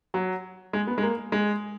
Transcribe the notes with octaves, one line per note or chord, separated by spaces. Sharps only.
F#3
G#3
B3
G#3
A#3
G#3